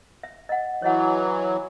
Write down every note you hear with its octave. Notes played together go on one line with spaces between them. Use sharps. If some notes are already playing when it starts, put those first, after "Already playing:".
E5
D#5 F#5
E3 F#3 C#5 D#5 F#5